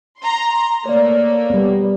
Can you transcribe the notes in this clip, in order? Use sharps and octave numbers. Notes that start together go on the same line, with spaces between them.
A#5 C6
A3 A#3 C#5 D5
G3 B3